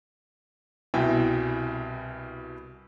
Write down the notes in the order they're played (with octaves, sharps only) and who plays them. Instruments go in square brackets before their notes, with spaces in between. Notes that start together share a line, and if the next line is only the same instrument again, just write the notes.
[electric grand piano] C2 B2 E4 E5 G5 G#5